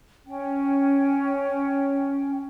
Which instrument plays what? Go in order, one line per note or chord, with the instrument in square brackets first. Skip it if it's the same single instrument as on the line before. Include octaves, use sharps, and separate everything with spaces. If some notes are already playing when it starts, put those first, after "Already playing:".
[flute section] C#4 G5